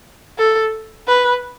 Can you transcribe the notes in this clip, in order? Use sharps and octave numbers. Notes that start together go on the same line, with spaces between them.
A4
B4